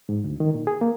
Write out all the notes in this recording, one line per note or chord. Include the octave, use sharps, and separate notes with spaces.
G#2
D2
D#3
A#2
G#4
A#3